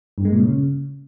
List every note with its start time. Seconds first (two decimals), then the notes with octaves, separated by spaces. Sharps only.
0.18 G2
0.25 G#3
0.32 A#2
0.40 C#3